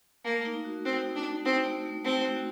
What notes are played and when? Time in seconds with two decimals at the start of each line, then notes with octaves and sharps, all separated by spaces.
0.24 A3 A#3
0.45 D#4
0.65 F#4
0.85 C4 F#4
1.04 D#4
1.15 D4
1.25 D#4
1.45 C4 D#4
1.65 A3
1.86 A3
2.04 A3 C4
2.25 F#4